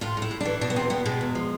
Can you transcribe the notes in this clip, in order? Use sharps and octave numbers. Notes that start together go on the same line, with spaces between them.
A2 F4
A2
E4
A2
E3 D4
B2 D4
B3
E2 C4
B2 B3
B2 G#3
E2
F3